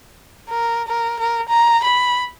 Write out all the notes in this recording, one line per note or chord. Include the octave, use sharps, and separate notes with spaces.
A#4
A#4
A#4
A#5
B5